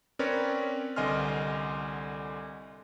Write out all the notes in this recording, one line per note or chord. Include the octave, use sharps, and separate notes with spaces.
C4 C#4 A#4 B4 C#5 D5
C2 D3 D#5 G#5 C6 F6